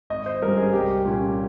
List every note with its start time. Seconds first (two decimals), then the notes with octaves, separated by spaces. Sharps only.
0.10 G#1 D#5
0.26 C5
0.42 G2 G3 C#4 A#4
0.57 G#4
0.73 C2 G4
1.05 A#2 G3 A#3 C#4